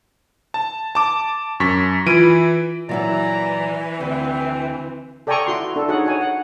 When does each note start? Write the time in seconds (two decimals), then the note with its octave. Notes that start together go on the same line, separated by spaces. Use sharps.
0.54 A5
0.95 A5 D6
1.60 F#2 C#6 B6
2.06 E3 F4 B5 G#6 D7 D#7
2.89 A#2 E3 F#3 E4 D5 A#5
4.00 D2 C4
5.27 A4 D5 G5 G#5 A#5 C#6
5.47 E4 F#4 C6
5.76 D4 A4
5.88 D#4 F#4 G#4 C#5 F#5
6.06 C#5 G#5
6.21 F#5